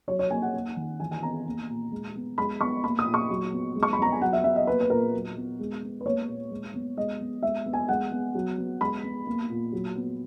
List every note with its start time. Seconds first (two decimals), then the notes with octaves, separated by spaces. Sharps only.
0.08 F#3 C#5
0.19 C#5
0.30 A#3 G#5
0.42 F#5
0.54 A#3
0.76 D#3
1.00 E3 G#5
1.11 G#5
1.23 B3 A#5
1.46 A#3
1.69 A#2
1.92 G#3
2.15 B3
2.38 G#3 B5
2.61 B3 C#6
2.83 A#3 B5
2.99 D#6
3.06 A#2
3.14 C#6
3.30 F#3
3.52 B3
3.76 G#3
3.83 C#6
3.93 B5
3.99 B3 A#5
4.12 G#5
4.21 F#3 F#5
4.33 E5
4.44 B3 E5
4.56 D#5
4.67 A#3 B4
4.81 B4
4.90 A#2 A#4
5.13 F#3
5.36 B3
5.60 G#3
5.83 B3
6.01 B4
6.06 A#3 C#5
6.28 A#2
6.51 G#3
6.74 B3
6.97 G#3 D#5
7.20 B3
7.42 G#3 E5
7.66 B3
7.73 G#5
7.89 G#3 F#5
8.12 B3
8.35 F#3
8.58 B3
8.81 G#3 B5
9.03 B3
9.27 A#3
9.50 A#2
9.72 F#3
9.96 B3